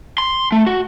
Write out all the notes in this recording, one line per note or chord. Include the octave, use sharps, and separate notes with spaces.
C6
A3
F#4